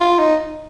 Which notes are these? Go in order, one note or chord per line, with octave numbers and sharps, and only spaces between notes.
F4
D#4